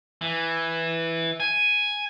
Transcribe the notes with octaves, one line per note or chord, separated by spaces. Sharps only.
E3
G#5